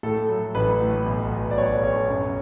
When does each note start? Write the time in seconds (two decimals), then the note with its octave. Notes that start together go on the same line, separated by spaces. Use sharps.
0.03 A2 A4
0.29 F#3
0.55 A1 B4
0.81 A2
1.06 B1
1.32 B2
1.51 D5
1.58 B1 C#5
1.83 B1 C#5
2.09 F#2